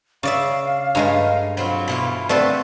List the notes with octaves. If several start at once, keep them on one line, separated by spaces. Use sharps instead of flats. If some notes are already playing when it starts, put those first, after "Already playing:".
C#3 D5 E5 F5
G2 G#3 A3 A#5
F#3 C4 F4 B5
B2 E3 F4
D3 D#3 A3 C4 A4 B4